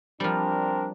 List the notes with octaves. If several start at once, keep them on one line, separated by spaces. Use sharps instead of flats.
F3 G3 C4 D4 A#4